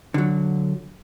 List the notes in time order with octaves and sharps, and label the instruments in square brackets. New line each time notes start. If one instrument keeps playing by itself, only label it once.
[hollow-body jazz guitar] D3 F#3